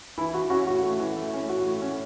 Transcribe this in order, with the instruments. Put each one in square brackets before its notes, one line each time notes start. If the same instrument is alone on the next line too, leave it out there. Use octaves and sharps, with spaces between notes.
[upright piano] E3 [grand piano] E4
[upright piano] E3 [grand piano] F#4
[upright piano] C#4 [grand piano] F#4
[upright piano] A2 [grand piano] F#4
[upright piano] A3
E3
A3
C#4
[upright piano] A2 [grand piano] F#4
[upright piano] A3
C#4